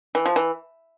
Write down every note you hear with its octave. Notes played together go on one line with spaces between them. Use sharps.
E3
F3
E3